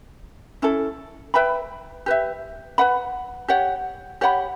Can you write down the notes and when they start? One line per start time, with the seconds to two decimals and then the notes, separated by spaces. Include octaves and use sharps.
0.62 C#4 E4 A4
1.34 B4 E5 G5 B5
2.06 G4 B4 E5
2.78 B4 F#5 B5
3.48 G4 C#5 F#5
4.21 G4 C#5 F#5 B5